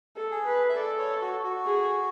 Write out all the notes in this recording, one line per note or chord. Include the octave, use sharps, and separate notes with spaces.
A4
G#4
B4
E5
A4 D5
C#5
F#4
F#4
G#4